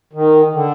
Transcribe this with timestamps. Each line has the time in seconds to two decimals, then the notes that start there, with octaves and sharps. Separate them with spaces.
0.13 D#3
0.53 D3